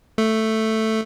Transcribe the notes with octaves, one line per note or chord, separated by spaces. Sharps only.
A3